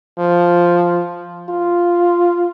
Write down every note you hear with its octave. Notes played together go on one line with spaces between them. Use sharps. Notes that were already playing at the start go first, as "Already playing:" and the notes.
F3
F4